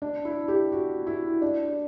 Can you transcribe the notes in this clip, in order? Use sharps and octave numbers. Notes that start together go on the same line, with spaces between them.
D4
E4
G4
F#4
E4
D4